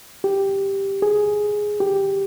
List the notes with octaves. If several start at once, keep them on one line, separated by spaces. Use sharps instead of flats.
G4
G#4
G4